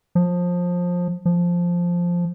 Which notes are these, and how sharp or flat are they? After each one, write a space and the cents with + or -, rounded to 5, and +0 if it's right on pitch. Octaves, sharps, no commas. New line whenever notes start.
F3 +20
F3 +0